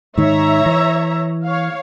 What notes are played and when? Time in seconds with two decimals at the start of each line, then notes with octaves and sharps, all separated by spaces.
0.18 G#2 D#3 C#5 E5 A#5
0.66 E3
1.44 C#5 F5